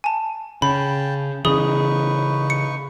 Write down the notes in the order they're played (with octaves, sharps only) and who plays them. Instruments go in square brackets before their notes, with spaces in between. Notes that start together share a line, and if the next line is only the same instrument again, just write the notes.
[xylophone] G#5 A5
[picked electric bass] C#3 [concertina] G5 A5 [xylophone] B5
[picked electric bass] C#3 E3 [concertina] D#4 B4 C#6 [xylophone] G#4 D#6 G7
[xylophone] C#7